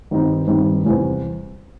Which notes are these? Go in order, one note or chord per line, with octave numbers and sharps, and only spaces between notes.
G2 D#3 G3 C4 D#4
G2 D#3 G3 C4 D#4
E2 C3 E3 G3